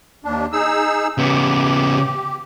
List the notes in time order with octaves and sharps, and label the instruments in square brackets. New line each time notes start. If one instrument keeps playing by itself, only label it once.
[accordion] D#2 D4
D#4 G#4 E6
[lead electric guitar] C#3 B3 [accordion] G4